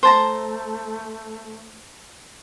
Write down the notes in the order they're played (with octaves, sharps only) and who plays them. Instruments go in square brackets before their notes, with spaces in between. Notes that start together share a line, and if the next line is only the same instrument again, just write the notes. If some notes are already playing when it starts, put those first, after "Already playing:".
[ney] A3 [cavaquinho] C5 A5 A#5